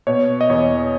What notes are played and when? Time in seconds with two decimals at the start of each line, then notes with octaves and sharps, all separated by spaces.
0.07 B2 C#5
0.41 D#5
0.49 E2 C#5